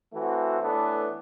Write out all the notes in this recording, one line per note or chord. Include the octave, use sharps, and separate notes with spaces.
E3 A3 C4 F#4
A2 E3 B3 D4 A4